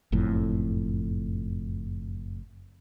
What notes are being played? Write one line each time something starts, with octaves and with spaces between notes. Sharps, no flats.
F#1 F2 A2